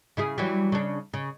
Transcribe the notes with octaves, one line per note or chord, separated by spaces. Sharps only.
C#3 E4 G#4
E3 F#3 G3
C#3 D4
C#3